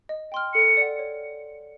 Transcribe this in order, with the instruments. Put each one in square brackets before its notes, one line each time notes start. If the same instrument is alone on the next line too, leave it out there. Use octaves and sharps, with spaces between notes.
[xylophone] D#5
G5 C6 F6
[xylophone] A4 [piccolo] C#7
[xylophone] D5 F#5
C#5